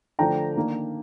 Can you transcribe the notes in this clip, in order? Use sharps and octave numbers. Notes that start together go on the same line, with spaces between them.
D3 F3 A3 D4 G5 A#5
D#3 A#3 D4